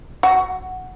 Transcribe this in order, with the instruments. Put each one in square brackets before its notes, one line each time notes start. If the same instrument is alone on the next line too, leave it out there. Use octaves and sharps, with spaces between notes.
[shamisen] F#4